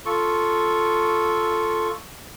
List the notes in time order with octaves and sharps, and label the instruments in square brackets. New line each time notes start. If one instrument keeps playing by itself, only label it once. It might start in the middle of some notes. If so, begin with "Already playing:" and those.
[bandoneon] F4 A4 C#6